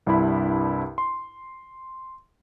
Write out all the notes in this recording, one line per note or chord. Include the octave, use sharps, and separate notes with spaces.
C2 G2 D4 E4 B5
C6